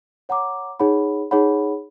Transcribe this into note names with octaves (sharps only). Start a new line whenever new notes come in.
C#5 F#5 A#5 D6
D#4 G#4 C#5 F#5 B5
D#4 G#4 C#5 F#5 B5